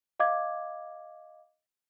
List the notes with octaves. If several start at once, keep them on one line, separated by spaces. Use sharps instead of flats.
D#5 F5 D6 G#6